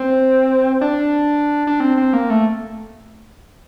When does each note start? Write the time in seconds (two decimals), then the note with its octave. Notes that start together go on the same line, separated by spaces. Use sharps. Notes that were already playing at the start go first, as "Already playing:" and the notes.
Already playing: C4
0.81 D4
1.67 D4
1.80 C4
1.97 C4
2.13 A#3
2.30 A3